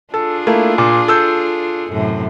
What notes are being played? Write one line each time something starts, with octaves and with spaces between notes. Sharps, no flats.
D4 F4 G#4 A4
A3 A#3 E4
A#2
A4 E6 G6
F#2 A2 C3